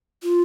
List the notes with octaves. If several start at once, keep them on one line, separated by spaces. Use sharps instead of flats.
F4